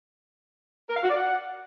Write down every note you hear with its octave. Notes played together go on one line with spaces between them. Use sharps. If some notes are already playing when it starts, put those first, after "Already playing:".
A#4
F5
F#4
D5
F#5